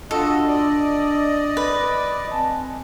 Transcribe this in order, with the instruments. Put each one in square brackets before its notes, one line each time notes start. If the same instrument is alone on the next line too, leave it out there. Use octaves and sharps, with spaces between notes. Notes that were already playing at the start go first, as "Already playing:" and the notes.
[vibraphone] D4 E6 [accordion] F4 F#4 D#5 [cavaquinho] A4
[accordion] D5 D#5
[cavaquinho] B4
[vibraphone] C4 G#5 A5